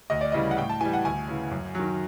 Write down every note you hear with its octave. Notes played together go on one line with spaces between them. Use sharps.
D2 D#5
D5
C#3 E3 G3 D#5
F#5
A2 G5
A5
E3 G3 G#5
F#5
D2 G#5
C#3 E3
F#2
D#3 F#3